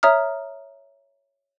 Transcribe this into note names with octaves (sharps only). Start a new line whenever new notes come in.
C#5 E5 A#5 D#6 F6